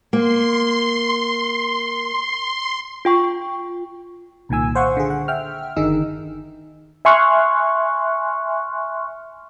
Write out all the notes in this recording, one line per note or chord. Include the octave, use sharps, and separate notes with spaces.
A#3 C6
F4 G5 C#6
C2 A#2 D#3 G#5 E6
C5 F5 F#5 C6 C#6
D3 G#4
F#5
E5 G5 F6
G1 D3 D#3 D#4 G#4 E6
E5 G#5 C6 C#6 F6 F#6